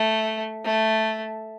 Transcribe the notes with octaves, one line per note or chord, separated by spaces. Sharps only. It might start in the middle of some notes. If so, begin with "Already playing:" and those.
Already playing: A3
A3